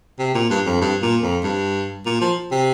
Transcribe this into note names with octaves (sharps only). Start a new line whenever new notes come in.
C3
A#2
G2
F2
G2
A#2
F2
G2
A#2
F3
C3